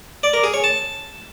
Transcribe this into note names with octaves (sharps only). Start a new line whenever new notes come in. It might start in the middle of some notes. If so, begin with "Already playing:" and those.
D5
A#4
G#4
C#5
A5